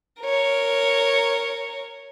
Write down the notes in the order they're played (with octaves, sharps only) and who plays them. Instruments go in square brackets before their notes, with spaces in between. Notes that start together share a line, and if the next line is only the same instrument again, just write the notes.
[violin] A#4 C#5